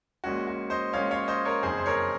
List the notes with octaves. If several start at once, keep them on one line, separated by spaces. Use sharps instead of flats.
A#1 A#2 G#3 C#4 F#4
F#4
C5 D#5
A#1 A#2 G#3 C#4 C#5 F5
C#5 F5
C5 D#5
A#4 C#5
F#1 F2 D#3 G#4 C5
C5
A#4 C#5